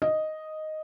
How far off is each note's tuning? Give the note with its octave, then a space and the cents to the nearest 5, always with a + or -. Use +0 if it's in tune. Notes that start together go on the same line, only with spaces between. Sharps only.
D#5 +0